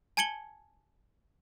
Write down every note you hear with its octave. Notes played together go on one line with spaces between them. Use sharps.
G#5 A5 G#6 C#7 F#7 G7